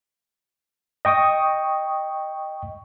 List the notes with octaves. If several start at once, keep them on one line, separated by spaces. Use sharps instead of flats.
D#5 G5 C#6 D#6